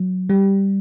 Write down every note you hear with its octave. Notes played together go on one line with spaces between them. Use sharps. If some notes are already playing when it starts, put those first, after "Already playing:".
Already playing: F#3
G3